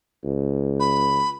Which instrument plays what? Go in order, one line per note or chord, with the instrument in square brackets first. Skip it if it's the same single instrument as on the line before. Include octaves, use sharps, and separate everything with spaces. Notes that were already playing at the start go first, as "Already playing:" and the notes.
[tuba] C#2
[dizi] B5